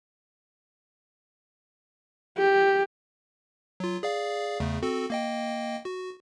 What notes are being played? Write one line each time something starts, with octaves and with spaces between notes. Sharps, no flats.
G4
F#3 F4
G#4 D5 F5
E2 C#3 A3
C4 F#4 A4
A#3 D#5 G5
F#4